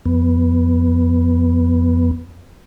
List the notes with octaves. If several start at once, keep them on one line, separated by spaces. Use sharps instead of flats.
F2 B3